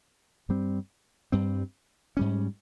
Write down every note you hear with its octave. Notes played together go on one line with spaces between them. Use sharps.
G2 G3 C4
G2 G3 C4
G#2 G3 C#4